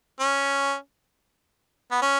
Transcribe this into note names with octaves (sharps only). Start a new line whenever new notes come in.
C#4
B3
C#4